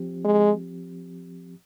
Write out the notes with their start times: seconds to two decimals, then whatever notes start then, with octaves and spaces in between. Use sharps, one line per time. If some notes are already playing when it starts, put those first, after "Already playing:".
Already playing: F3 C4 G4
0.25 G#3